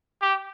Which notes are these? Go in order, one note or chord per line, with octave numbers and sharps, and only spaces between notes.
G4